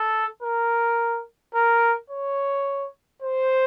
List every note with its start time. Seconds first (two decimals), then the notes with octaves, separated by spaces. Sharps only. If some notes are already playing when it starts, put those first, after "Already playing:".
Already playing: A4
0.43 A#4
1.55 A#4
2.10 C#5
3.22 C5